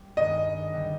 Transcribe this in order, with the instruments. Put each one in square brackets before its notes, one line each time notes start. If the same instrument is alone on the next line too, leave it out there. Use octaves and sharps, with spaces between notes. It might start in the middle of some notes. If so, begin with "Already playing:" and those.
Already playing: [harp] G3
[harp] G2 D#3 G#3 B3 D4 [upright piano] D#5
[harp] D3 G3 B3